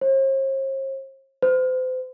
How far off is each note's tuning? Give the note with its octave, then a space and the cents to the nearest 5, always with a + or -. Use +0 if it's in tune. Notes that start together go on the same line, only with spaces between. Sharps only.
C5 +45
C5 -35